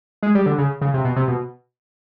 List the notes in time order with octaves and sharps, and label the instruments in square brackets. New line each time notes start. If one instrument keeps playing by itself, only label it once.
[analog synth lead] G#3
G3
D3
C#3
C#3
C3
B2
C3
B2